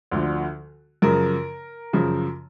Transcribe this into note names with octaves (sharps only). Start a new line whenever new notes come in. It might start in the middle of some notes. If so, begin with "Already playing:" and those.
D2 D3 F3
F#2 C#3 F3 A#4
F#2 C#3 F3